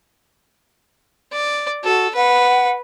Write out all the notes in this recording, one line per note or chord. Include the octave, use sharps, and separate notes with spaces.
D5
F#4 A4
B4 F#5